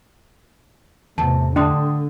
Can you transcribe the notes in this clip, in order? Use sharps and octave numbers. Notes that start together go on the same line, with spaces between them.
E2 A2 C3 A5
D3 D4 G5 C6 D#6